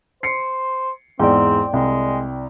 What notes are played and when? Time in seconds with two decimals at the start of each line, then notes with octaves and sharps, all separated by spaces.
0.23 C5 C7 C#7
1.20 E2 G#2 C4 D5 G5
1.73 C2 G#3